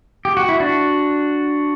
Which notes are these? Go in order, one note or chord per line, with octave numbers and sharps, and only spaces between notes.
G4
F#4
E4
D4 F#4